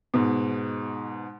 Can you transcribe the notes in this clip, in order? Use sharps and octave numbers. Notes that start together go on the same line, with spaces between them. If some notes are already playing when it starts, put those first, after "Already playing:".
G#2 B2